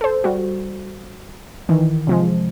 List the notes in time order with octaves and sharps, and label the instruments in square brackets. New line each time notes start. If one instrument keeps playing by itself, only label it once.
[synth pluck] A4 C5
G3 F#4
D#3 E3
C3 F3 G#3